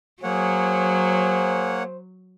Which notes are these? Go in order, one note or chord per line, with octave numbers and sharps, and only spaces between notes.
F#3 A#3 G#4 C5 C#5 F#5